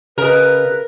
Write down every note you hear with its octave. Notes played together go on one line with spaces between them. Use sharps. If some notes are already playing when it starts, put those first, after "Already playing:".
C#3 A#4 B4 D#5